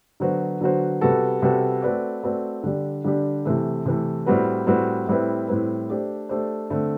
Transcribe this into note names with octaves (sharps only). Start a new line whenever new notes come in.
D3 F#3 B3 F#4 C5
D3 F#3 B3 F#4 C5
C3 G3 B3 F#4 A4
C3 G3 B3 F#4 A4
A3 C4 F#4 B4 D5
A3 C4 F#4 B4 D5
D3 G3 D4 G4
D3 G3 D4 G4
C3 E3 A3
C3 E3 A3
A2 G3 C4 F#4 B4
A2 G3 C4 F#4 B4
A2 G3 C4 E4 B4
A2 G3 C4 E4 B4
A3 D4 G4 C5
A3 D4 G4 C5
D3 A3 C4